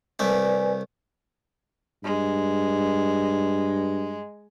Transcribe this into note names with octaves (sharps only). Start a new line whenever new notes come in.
C2 A3 B4 D5 G#5
G2 G#3